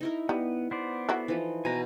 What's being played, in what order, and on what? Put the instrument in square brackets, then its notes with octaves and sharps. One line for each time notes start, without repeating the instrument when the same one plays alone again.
[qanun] D#4 E4 A#4
[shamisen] G3 [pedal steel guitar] B3
[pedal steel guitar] B3 C5 D5
[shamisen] E4 F#4 A4
[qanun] E3 F3 D#4
[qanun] B2 [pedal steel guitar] G#5 A#5